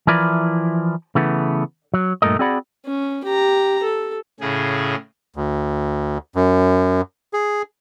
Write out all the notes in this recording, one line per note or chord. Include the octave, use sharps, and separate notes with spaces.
E3 F3 E4 A#4 B4 D5
C#3 E3 A3 B3
F#3
G2 A#2 A3 A#4 D#5
C4 F#4 G#4 D5 F#5 B5
C#4
G4 A#5
A4
A2 C#3 G#4
D2
F#2
G#4